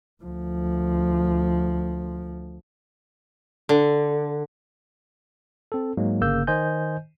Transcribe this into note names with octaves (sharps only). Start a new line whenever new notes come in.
D2 F3
D3
C4 A4
G#2 F#3 G#3 A#3
G1 C#3 A#3 E6 G6
D#3 C5 D#5 G#5 G6